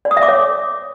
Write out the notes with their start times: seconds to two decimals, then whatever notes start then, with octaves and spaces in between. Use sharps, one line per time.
0.05 D5
0.11 D#6
0.17 E5
0.23 D6
0.28 C#5